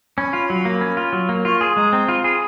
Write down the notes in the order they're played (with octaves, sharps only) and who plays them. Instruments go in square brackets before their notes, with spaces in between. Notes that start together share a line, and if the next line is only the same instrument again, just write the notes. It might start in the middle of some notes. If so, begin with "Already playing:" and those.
[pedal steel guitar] C#4 [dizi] B5
[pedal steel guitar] F4
F#3
A#3
C#4
F4
F#3
A#3
[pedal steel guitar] F4 [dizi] C#6
[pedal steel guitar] G#4 [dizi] C6
[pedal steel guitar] G#3 [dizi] A#5
[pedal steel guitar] C4 [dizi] A#5
[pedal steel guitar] F4 [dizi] B5
[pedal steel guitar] G#4 [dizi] B5